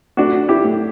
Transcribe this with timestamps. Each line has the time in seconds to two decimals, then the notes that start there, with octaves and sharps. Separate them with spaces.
0.17 A2 D4 F#4
0.48 E4 G4
0.64 A2